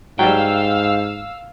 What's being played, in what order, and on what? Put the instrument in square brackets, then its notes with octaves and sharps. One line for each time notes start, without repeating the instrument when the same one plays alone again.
[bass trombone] G#2 [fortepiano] F#3 G3 [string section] F5 E6 [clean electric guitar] G5